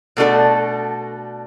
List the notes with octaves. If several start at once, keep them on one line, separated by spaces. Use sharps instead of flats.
B2 A3 D4 F#4 A4